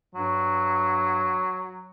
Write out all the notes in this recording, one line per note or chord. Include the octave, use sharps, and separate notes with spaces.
G2 F#3